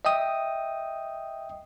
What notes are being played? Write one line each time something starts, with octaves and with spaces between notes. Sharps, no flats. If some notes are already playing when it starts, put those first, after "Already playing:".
D#5 E5 G5 D#6